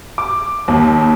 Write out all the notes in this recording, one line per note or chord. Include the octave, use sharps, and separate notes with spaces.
D6
D#2